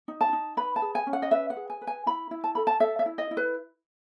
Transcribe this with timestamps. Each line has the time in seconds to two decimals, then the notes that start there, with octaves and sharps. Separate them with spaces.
0.08 D#4
0.21 A5
0.33 D#4
0.57 B4 B5
0.76 A5
0.82 G#4
0.95 G#5
1.07 C#4
1.13 F#5
1.22 D#5
1.31 B4 E5
1.50 F#5
1.56 G#4
1.70 G#5
1.81 B4
1.87 G#5
2.06 E4 B5
2.31 E4
2.44 A5
2.55 A4 B5
2.67 A5
2.80 A4 E5
2.99 E5
3.06 E4
3.18 D#5
3.31 E4
3.37 B4